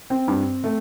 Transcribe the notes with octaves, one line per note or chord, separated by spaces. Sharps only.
C4
G2
A3